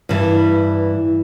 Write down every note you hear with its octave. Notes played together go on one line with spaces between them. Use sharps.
G2 E3 G3